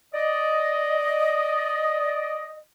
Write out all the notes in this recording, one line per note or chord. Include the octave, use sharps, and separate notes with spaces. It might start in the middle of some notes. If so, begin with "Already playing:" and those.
D5 D#5